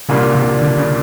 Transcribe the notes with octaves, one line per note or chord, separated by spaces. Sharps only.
C2 A#2 C#3 G3 A#3 D4
C3
D3
C#3